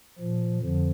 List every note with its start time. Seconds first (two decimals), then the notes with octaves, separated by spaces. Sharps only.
0.19 A#2 F3
0.62 F2 D3 F3